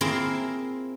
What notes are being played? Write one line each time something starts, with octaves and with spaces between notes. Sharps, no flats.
A#3 C4 E4 F4 G#4 A#4